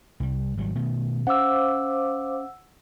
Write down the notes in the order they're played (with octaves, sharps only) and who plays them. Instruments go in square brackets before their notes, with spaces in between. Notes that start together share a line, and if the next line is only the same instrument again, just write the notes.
[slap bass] C2 G3
G#1 F#3 G3
B2 D#3 A3
[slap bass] C#4 [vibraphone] C5 F5 D6 [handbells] F#5 E6